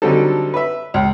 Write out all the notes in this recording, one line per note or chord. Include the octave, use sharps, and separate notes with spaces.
D3 F#3 G3 C4 D#4 A4
B4 E5
C#2